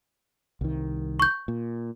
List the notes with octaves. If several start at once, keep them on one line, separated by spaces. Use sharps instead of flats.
C2 D#3
C#6 G6
A#2